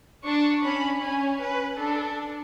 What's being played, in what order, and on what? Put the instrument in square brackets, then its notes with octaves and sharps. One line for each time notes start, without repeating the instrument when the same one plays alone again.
[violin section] D4 [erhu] C#6
[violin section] C#4 [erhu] B5
[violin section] C#4 [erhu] G#5
[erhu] B4
[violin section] D4 [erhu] A4